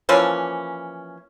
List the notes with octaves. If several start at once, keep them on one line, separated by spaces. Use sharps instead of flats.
E3 F3 A#3 C#4